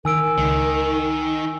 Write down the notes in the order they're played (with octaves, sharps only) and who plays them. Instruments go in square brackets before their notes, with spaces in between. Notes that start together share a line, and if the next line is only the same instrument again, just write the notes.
[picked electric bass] D#3 [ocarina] A#4 [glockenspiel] G#5 E6 D7
[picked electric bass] C#2 [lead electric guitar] D#3